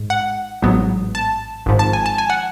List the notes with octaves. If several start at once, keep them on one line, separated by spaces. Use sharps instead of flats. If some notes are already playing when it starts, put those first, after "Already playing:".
Already playing: A1 G#2 G#3
F#5
A1 G#2 F#3 B3
A5
G#1 G#2 F3
A5
G#5
A5
G#5
F#5